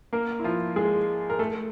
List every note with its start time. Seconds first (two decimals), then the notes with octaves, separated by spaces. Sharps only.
0.13 A#3 A#4
0.40 E4
0.44 F3 F4
0.76 G#3 G#4
1.30 A#4
1.39 A3 A4